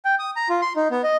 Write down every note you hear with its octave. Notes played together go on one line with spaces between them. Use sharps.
G5
D#6
A#5
F4
C6
D#4
B3
D#5